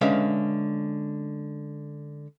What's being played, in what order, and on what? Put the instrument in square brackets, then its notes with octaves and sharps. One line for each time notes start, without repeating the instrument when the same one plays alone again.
[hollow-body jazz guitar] D3 G#3 C#4 B4 E5 F5